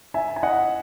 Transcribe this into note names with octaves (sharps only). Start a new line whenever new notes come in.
E5 G#5
G#5
D#5 F#5